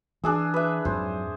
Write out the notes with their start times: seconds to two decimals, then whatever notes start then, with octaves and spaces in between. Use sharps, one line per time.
0.24 E3 D4 G#4 E6
0.54 B4 E5
0.85 F2 G#2 F#3 C5